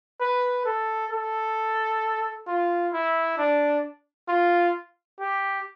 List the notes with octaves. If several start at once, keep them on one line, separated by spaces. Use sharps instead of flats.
B4
A4
A4
F4
E4
D4
F4
G4